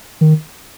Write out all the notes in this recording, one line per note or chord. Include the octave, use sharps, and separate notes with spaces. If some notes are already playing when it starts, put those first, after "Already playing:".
D#3